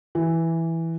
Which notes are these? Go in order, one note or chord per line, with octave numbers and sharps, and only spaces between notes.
E3